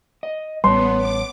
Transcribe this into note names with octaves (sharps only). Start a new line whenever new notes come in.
D#5
A1 G3 B3 B4 C#5 A5 C6
D6